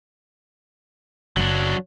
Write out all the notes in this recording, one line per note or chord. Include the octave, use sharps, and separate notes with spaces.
F#1 F#3 D4